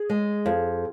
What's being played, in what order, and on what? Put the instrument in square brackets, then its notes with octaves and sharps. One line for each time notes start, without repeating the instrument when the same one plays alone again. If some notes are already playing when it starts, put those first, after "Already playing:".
Already playing: [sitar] G#4
[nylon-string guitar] G#3
F2